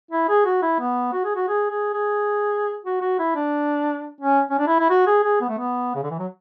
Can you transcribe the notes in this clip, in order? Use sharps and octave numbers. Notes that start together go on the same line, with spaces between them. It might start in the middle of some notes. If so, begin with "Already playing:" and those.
E4
G#4
F#4
E4
B3
F#4
G#4
F#4
G#4
G#4
G#4
F#4
F#4
E4
D4
C#4
C#4
D4
E4
E4
F#4
G#4
G#4
B3
A3
B3
C#3
D3
E3
F#3